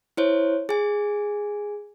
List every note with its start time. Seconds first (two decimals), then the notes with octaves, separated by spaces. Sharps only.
0.17 E4 C5 C#5
0.69 G#4 G#5